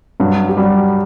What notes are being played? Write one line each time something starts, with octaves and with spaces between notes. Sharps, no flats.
G2 F#3 F#4
G4
F#3 G3 F#4